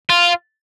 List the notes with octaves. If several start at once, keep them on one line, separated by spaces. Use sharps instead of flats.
F4